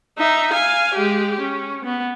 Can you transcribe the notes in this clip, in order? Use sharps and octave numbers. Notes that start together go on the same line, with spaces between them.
D#4 E5
F5 G#5
G#3 G4
C#4
B3